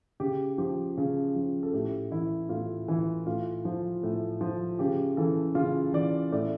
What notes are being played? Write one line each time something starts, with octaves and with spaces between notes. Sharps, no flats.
C#3 G4
F3 G4
C#3
F3
A4
A2 G4
E3 E4
A2 F4
E3 E4
A2 F4
F3
A2
F3
C#3 G4
E3 A4
C#3 F4
E3 D5
A2 D5